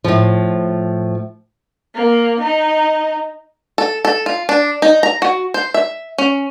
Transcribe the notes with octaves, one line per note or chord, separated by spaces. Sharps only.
A2 F3
A#3
D#4
A4
A4
F4
D4
D#4
A#5
F#4
C5
E5
C#4